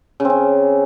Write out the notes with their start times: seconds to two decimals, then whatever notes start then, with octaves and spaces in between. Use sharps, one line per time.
0.20 C#3
0.25 C4
0.30 C#4